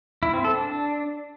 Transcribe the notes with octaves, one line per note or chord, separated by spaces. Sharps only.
E4
C4
A4
D4